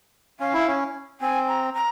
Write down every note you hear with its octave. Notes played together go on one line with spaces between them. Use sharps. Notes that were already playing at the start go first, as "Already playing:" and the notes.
C#4 F5
E4
C#4
C4 G#5
A#5
A#5